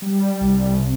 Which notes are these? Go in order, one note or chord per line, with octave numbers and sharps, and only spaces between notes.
G3
C2
C3